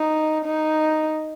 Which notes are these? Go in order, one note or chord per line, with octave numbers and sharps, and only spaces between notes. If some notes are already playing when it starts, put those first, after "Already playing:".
Already playing: D#4
D#4